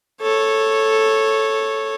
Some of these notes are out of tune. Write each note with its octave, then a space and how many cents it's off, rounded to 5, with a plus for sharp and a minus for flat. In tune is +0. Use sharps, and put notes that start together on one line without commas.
A4 +0 C#5 -10